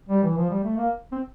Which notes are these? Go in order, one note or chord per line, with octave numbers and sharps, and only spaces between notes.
G3
E3
F3
G3
A3
A#3
C4